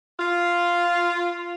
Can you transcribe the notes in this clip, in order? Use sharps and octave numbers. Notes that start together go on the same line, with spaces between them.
F4